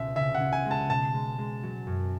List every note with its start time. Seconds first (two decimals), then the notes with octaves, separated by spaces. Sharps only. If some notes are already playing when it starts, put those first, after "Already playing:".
Already playing: C#2 B2 C#4 E5
0.16 C#3 E5
0.35 F#5
0.40 C#3
0.53 G#5
0.65 G#3
0.71 A5
0.90 B2 A5
1.14 G#3
1.38 G#3
1.63 F#3
1.87 F#2